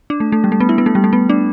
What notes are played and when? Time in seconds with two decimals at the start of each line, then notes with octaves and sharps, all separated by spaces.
0.10 D4
0.20 A3
0.32 A3
0.44 G3
0.52 A3
0.60 B3
0.69 E4
0.78 B3
0.86 A3
0.95 G3
1.04 A3
1.13 B3
1.30 D4